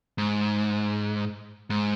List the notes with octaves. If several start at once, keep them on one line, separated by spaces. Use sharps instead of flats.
G#2
G#2